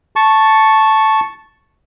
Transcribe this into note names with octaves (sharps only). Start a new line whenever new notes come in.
A5 C#6